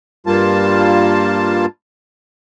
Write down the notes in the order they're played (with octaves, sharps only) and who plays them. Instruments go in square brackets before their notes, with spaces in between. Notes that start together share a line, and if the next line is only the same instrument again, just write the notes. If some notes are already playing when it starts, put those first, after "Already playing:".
[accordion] G2 G3 A#3 F4 A5